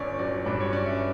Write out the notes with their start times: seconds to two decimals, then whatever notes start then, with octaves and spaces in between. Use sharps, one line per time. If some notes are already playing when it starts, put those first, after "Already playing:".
Already playing: G1 C#4 C#5 D5
0.19 F#3 D5
0.45 G2 D5
0.60 C#5
0.72 C#4 D5
0.86 E5